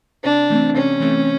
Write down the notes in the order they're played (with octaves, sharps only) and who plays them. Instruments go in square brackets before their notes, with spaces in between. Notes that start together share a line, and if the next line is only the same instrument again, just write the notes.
[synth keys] C3 [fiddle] D4
[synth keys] E3 A3 C4
[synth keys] C3 [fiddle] C#4
[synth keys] E3 A3 C4